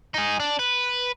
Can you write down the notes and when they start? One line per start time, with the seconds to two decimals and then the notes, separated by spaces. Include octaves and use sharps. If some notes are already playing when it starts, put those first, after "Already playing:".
0.14 D#4 G#4
0.40 D4
0.59 B4